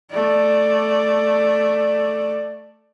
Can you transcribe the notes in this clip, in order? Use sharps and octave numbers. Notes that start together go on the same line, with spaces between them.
A3 D5